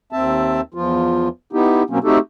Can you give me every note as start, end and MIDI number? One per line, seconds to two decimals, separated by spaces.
0.12 0.61 39
0.12 0.61 60
0.12 0.61 76
0.12 0.61 81
0.74 1.28 40
0.74 1.28 53
0.74 1.28 65
1.53 1.83 59
1.53 1.83 63
1.53 1.83 64
1.53 1.83 67
1.90 1.99 47
1.90 1.99 54
1.90 1.99 58
1.90 1.99 60
1.90 1.99 61
2.04 2.18 57
2.04 2.18 60
2.04 2.18 63
2.04 2.18 66
2.04 2.18 67
2.04 2.18 69